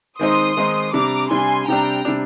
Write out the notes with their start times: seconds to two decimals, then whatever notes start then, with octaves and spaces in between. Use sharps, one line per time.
0.19 D#3 G#3 C4 D#4 C6 D#6
0.57 D#3 G#3 C4 D#4
0.93 C3 G3 D4 A#5 D6
1.31 C3 G3 D4 G#5 C6
1.68 C3 G3 D4 G5 A#5
2.05 C3 G3 D4